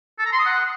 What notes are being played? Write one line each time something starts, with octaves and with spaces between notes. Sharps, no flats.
A4
A#5
C6
D#6
F#5